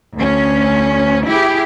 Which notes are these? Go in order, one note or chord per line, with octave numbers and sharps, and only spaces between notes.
D2 C#4
E4 G4 G#4